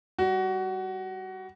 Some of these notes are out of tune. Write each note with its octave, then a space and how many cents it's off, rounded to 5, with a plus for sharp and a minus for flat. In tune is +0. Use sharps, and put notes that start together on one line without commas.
G3 +0 F#4 +20